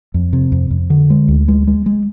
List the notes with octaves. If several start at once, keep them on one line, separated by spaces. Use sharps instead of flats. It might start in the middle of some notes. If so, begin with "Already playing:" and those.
F2
C3
F2
F2
D3
G#3
D2
G#3
G#3
G#3